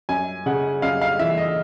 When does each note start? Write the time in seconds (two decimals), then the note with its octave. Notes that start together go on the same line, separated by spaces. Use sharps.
0.09 F#2 G#5
0.46 C#3 F#5
0.82 F#2 F5
1.01 F5
1.19 E3 E5
1.38 D#5